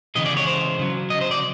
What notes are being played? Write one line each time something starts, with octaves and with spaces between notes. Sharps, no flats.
C#3 E3 G#3 D#5
D5
C#5
C5
C#3 F#3
D#5
C5
D5